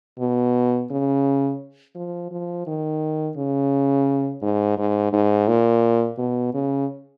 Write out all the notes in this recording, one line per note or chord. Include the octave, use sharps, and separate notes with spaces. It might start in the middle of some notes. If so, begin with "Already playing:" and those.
B2
C#3
F3
F3
D#3
C#3
G#2
G#2
G#2
A#2
B2
C#3